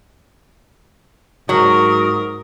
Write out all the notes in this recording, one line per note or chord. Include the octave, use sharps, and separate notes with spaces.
G#2 F#3 A#4 D#6